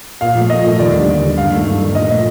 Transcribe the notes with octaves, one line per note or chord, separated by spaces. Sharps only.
A#2 F5
F3 A3
A#2 D#5
F3 A3
D#2 D5
D3 G3
D#2
D3
G3
G2 F5
D#3 A3
G2
D#3 A3
A#2 D#5
F3 A3 D#5